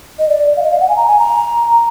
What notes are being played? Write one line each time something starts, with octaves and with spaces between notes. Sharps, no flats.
D#5
D5
F5
D#5
F5
F#5
G#5
A#5
G#5
A#5